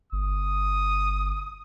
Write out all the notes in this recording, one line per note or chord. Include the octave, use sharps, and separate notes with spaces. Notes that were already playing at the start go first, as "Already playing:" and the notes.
G1 D#6